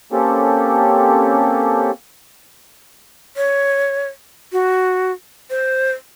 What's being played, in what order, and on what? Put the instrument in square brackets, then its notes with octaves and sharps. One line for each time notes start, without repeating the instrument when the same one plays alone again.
[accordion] A#3 C4 C#4 G4 A4
[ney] C#5
F#4
C5